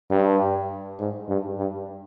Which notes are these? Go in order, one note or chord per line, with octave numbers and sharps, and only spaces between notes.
G2
G#2
G2
G2